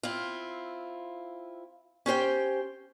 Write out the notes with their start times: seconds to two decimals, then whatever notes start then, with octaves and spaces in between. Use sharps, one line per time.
0.03 C4 E4 F4
2.06 C#4 G4 C5 G5